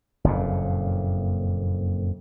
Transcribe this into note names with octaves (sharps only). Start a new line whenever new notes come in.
F#1 F2 A#2